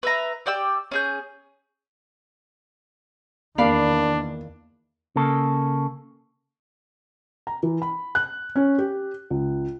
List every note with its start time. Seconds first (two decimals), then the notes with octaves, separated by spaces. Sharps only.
0.03 B4 E5 A#5
0.46 G4 D5 G5 E6
0.91 C#4 G#4 G6
3.58 E2 D#3 A#3 D4 D5 F5 B5
5.16 C#3 A#3 A4
7.47 A#5
7.63 E3
7.82 B5
8.15 F#6
8.56 C#4
8.78 G4
9.30 C#2